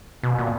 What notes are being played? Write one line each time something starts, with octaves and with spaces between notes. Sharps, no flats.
B2
A#2